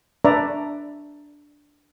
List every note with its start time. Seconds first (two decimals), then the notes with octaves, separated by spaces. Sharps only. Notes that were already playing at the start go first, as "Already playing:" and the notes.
0.25 D4 B4 D5 E5 A#5 C#6